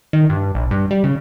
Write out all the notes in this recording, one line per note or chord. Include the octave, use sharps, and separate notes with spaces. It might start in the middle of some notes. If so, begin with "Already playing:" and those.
D#3
G2
A#1
G2
G3
C#3